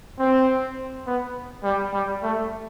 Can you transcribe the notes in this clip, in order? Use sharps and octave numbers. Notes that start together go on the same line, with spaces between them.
C4
B3
G3
G3
A3